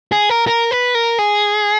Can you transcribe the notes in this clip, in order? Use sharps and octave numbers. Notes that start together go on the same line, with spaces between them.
G#4
A#4
A#4
B4
A#4
G#4